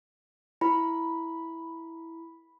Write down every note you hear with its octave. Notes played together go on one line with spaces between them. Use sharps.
E4 B5